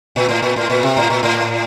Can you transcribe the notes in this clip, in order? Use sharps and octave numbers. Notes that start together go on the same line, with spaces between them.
A#2
A2
A#2
A2
A#2
C3
A2
A#2
A2